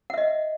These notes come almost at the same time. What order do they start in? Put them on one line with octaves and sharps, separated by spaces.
F#5 E5 D#5